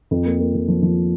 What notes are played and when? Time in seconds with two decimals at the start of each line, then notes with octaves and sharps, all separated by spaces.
0.11 F2
0.26 A#3
0.40 A#3
0.54 F2
0.68 F3
0.83 F3